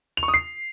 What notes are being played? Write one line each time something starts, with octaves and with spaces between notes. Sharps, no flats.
F7
C#6
D#6
C7